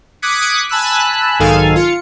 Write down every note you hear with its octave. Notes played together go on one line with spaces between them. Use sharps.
D6 D#6 F#6 G#6 B6 C#7
G#5 A5 B5 E6 F#6
B1 G#2 D#3 A4 F5 G#5
F4 C#7